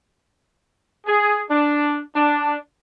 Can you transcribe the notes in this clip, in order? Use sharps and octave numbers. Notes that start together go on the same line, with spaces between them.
G#4
D4
D4